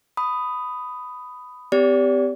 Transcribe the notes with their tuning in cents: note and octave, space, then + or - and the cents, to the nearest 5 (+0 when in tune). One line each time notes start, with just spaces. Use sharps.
B5 +10 D#6 +0
C4 -45 G4 +10 D5 -35